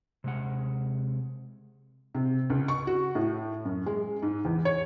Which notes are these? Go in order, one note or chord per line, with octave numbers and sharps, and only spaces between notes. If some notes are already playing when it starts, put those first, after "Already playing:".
C3 G#3 F#5
C3
C#2
C#6
F#4
A2
F#2
G#3
G#2
E2
C#5